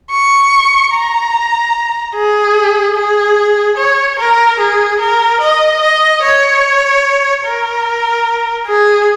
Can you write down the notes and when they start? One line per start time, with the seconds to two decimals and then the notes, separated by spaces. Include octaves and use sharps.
0.11 C#6
0.93 A#5
2.15 G#4
2.96 G#4
3.77 C#5
4.19 A#4
4.60 G#4
5.00 A#4
5.40 D#5
5.81 D#5
6.23 C#5
7.45 A#4
8.67 G#4